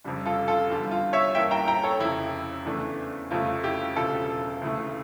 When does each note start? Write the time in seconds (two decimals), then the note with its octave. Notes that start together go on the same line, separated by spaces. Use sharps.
0.04 F1 F2 C#3 G3 D4
0.26 F4 A4
0.48 F4 A4
0.70 E2 D3 G3
0.91 F4
1.13 C#5 E5
1.35 G2 E3 A#3 C#4 E5 G5
1.51 G5 A#5
1.67 G5 A#5
1.84 A4 C#5
2.00 F1 F2 C#3 E4
2.65 E2 C#3 E3 A3 D4
3.31 F1 F2 C#3 F3 A3 F4
3.63 E4 G4
3.96 E1 D2 C#3 F3 F4 A4
4.62 D2 C#3 E3 A3